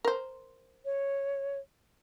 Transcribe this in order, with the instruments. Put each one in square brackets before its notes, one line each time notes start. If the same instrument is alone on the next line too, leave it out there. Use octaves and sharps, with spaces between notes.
[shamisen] A#4 C5
[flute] C#5